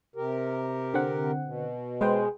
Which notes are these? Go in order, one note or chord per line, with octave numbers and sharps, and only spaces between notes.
C3 G4 A#4
D3 C4 F#5
B2
G#3 B4 C5 G5